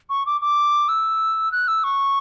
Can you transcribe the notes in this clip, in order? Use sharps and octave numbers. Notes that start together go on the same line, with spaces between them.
C#6
D6
D6
E6
F#6
E6
C#6